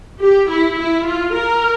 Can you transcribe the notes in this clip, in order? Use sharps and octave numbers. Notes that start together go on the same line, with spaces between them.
G4
E4
E4
F4
A#4